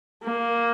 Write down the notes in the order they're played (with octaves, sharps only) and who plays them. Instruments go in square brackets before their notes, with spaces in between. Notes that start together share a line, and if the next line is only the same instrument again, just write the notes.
[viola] A#3